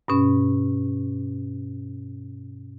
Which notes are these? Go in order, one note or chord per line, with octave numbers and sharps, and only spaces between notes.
G2 B2 C#4